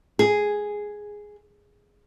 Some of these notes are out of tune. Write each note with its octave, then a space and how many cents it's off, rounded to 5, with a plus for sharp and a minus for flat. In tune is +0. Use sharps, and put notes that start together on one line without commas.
G#4 +0